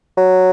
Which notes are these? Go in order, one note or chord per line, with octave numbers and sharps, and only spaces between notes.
F#3